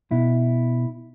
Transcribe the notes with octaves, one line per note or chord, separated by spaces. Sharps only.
B2 E4